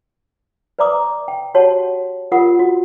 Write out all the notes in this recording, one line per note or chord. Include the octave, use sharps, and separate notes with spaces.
B4 D5 E5 A#5 D6 D#6
G5
F#4 G4 C#5 F#5 A5
F4 G4 A#4 F#5 D#6
F#4